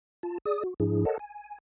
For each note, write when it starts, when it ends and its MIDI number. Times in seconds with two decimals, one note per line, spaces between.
0.23 0.38 65
0.23 0.38 81
0.45 0.63 68
0.45 0.63 74
0.45 0.63 87
0.64 0.74 66
0.80 1.05 44
0.80 1.05 53
0.80 1.05 62
0.80 1.05 64
0.80 1.05 68
1.05 1.18 69
1.05 1.18 70
1.05 1.18 73
1.05 1.18 75
1.05 1.18 78
1.05 1.18 81
1.19 1.58 80